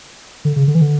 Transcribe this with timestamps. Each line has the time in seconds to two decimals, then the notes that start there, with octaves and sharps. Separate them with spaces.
0.45 D3
0.56 C#3
0.68 D3
0.75 E3
0.81 D3